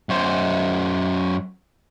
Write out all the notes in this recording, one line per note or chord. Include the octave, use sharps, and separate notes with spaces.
F#2 C5